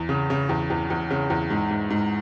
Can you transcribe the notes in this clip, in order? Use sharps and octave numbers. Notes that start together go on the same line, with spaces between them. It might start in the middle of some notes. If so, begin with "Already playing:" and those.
Already playing: E2
C#3
C#3
E2
E2
E2
C#3
E2
G#2
G#2
G#2